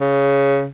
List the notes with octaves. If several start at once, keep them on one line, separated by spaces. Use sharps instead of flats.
C#3